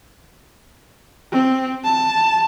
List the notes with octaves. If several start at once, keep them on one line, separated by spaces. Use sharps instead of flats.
C4
A5